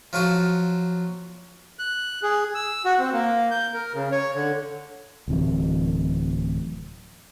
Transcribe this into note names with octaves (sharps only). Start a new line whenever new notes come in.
F3 F#3 F4 F#4
F#6
G#4
E6
F#4
C4
A#3
G6
A#4
C#3
C#5
D3
D1 C3 E3 F#3